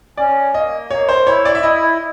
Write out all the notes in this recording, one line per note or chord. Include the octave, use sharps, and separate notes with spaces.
C#4 D5
A#3 D#5
A#3 C#5
C5
E4 C#5
D5
E5
E4 D#5